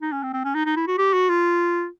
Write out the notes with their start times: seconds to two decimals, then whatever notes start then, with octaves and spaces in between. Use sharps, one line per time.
0.01 D#4
0.12 C#4
0.23 C4
0.33 C4
0.44 C#4
0.55 D#4
0.66 D#4
0.76 E4
0.87 F#4
0.98 G4
1.13 F#4
1.29 F4